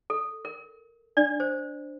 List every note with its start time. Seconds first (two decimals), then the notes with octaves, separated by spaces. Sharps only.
0.10 A4
0.45 A#4
1.17 D4 D5
1.40 C5